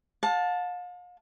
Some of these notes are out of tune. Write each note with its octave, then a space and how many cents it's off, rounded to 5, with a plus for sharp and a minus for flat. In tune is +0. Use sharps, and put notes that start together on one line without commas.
F5 +40 A5 +0